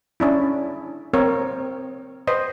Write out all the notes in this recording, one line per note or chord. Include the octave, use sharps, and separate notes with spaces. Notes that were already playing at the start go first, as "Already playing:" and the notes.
C#4 D4 E4
C4 A#4 C#5
B4 C5 D#5